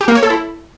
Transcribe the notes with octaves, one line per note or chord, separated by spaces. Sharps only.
G4
A#3
C#5
A4
E4